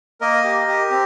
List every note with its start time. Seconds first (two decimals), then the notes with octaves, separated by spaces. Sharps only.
0.21 A#3 A#4 D#5
0.44 G4
0.68 G4
0.91 C4